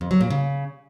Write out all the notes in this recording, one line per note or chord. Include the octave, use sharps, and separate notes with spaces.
F2
F#3
A#2
C#3